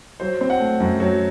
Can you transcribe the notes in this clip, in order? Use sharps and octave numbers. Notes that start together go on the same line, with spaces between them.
F#3 C5
C4
F#5
A3
F#2
F#3